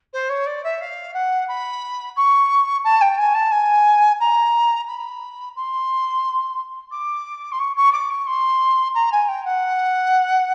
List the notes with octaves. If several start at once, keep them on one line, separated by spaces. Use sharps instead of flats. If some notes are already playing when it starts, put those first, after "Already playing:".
C5
C#5
D5
E5
F5
F#5
B5
C#6
A5
G5
G#5
A5
G#5
A#5
B5
C6
D6
C6
C#6
C#6
D6
C#6
C6
A#5
G#5
G5
F#5